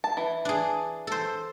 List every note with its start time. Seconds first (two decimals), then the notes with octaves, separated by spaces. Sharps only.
0.04 A5
0.17 E3
0.45 D4 G#4
1.07 A4 C5